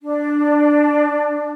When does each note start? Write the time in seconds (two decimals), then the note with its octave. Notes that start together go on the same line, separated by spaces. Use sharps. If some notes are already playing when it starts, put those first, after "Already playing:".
0.01 D4